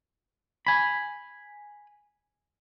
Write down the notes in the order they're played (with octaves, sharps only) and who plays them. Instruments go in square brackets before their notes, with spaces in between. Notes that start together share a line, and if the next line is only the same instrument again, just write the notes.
[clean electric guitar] G#5 B5